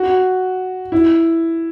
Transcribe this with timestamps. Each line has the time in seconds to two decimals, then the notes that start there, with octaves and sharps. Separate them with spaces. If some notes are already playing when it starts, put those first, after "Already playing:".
Already playing: F#4
0.92 E4